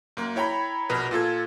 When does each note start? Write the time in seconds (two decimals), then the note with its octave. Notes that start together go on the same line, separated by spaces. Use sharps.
0.17 F#2 A#3
0.36 E4 C#5 G5 A#5 B5
0.89 A#1 B2 A#4 B4
1.11 A#2 F4 A4 G#6